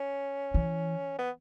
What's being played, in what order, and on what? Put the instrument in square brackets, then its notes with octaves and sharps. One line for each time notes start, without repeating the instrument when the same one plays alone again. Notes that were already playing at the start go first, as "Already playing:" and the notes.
Already playing: [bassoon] C#4
[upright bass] E3
[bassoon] B3